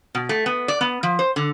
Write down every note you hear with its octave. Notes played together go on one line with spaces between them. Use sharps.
B2
A3
B3
D5
B3
F3
C5
D3